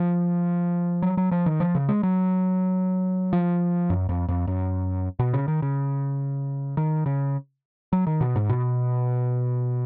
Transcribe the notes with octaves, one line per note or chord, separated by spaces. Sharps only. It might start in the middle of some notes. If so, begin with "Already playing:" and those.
Already playing: F3
F#3
F#3
F3
D#3
F3
C#3
G#3
F#3
F3
F#2
F2
F2
F#2
B2
C#3
D#3
C#3
D#3
C#3
F#3
D#3
B2
G#2
B2